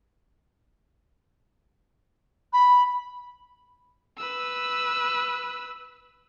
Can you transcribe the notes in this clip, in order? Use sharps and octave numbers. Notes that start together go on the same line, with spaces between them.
B5
B4 E6